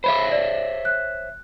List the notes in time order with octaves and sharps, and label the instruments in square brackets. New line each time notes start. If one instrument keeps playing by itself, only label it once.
[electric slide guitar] C5 C#5 E5 [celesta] B5
[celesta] D5
F#6